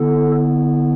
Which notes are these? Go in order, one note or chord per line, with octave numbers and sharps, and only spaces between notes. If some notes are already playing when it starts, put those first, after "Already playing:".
Already playing: D3 B3 E4 A4